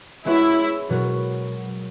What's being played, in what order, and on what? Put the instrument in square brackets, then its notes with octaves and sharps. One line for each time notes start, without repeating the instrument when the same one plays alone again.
[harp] G#3 B3 F#4 C#5 [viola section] E4
[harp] B2 F#3 B3 F#4 A#4